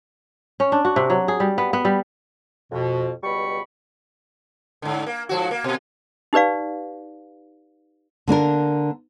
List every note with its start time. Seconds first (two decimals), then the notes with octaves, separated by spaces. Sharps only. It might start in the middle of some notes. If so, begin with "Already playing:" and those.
0.60 C#4
0.72 D4
0.85 F#4
0.96 C3
1.10 F#3
1.28 G#4
1.40 G3
1.58 B3
1.73 B3
1.85 G3
2.71 F2 B2
3.23 C#2 B2 G3 B5 C#6
4.82 G#2 D3
5.07 A#3
5.29 G#2 F3 F#4
5.51 A#3
5.64 B2
6.33 D#4 G4 B4 D5 F5
8.27 D3 A#3 D4 A#4